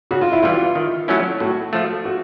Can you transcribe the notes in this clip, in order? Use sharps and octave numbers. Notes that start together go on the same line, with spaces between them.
C#3 F#4
F4
E4
E3 G3 F4
D#3
F#3 A3 C#4 E4
A2 F#4
F3 A3
F#4